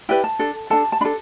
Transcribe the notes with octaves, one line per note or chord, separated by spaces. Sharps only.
E4 G4 B4 D5
A5
D4 A4
D4 A4 A5
A5
D4 A4 B5